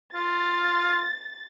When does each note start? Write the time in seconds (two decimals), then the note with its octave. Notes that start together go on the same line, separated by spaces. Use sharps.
0.15 F4 A6